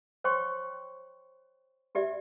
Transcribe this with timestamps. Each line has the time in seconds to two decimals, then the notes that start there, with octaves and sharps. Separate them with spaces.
0.24 C5 C#5 G5 C6 C#6
1.95 F#4 G4 D5 E5